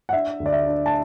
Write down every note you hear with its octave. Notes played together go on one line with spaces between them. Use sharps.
F#5
D4 E5
D2
D5
E5
D4
A5